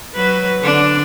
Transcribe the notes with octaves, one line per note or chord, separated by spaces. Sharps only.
F#3 B4
D3 D4